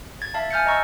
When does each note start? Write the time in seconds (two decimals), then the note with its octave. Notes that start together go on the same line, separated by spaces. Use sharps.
0.22 G#6 A6
0.34 E5 F5 A5
0.51 G#5 F6 G6 A6 C#7
0.66 D#5 A#5 C#6 E6